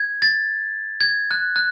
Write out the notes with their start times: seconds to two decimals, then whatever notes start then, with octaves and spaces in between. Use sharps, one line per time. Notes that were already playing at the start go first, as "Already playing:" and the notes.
Already playing: G#6
0.22 A6
1.01 G#6
1.31 F#6
1.56 F#6